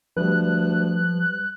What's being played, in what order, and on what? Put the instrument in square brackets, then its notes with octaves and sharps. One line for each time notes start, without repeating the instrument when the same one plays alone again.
[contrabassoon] D2 [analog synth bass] F3 [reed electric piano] G3 B4 [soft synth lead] F#6